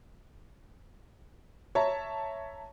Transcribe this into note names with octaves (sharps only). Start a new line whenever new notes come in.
C#5 E5 A5 A#5